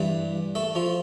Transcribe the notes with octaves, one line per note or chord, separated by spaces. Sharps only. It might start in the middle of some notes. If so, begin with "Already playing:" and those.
Already playing: G2 E3 G3
A3 A4
F3 F4